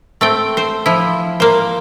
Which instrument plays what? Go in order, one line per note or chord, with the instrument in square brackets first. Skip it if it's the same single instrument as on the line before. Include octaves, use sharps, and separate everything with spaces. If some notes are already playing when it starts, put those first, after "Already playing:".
[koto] A3 C4 G5
C5
F3 E4
A#3 C5